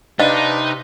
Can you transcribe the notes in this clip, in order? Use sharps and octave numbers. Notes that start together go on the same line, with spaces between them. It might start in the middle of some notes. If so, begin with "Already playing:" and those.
C3 D4 D#4 B4 D#5 F5